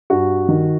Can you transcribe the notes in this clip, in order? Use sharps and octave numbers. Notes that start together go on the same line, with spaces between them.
G2 F#4
D#3